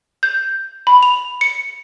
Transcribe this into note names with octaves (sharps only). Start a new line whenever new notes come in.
G6
B5
F7
C#7